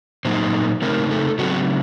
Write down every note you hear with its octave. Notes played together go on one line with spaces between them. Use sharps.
A#2 F#3 A#3 D#4 C5
C#3 A3 C4 D#4 A#4
A4
C#3 F#3 C4 F#4